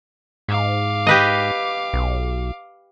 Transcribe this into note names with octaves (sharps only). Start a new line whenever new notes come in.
G#2 F5 D6
G4 B4 D#5
B1